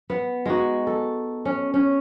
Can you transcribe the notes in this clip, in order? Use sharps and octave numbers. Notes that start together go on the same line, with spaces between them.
B3
G#3 D#4 F#4
A4
C#4
C#4